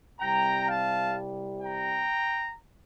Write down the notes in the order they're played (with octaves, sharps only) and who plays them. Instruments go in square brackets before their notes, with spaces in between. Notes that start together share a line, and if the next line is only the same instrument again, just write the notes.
[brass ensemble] C2 C3 G3 G5 A#5
F5 A5
G5 A#5